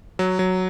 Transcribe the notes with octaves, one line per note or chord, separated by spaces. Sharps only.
F#3
F#3